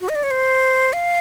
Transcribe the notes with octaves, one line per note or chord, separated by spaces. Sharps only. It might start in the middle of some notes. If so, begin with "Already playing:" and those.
F#4
D#5
D5
C#5
C5
F5